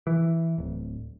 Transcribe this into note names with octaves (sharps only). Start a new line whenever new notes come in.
E3
D1